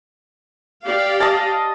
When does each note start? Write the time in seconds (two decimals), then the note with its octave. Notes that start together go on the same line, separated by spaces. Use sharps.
0.85 G4 D5 F5
1.20 D#5 A5